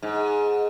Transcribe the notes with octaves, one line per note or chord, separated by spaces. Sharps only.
G#2